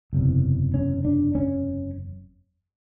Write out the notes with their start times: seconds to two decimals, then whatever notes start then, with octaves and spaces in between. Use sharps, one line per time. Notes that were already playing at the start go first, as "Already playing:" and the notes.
0.13 F#1 E2 C3
0.74 C#4
1.05 D4
1.35 C#4